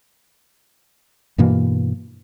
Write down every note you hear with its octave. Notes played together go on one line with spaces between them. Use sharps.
G2 B2 E3 A#3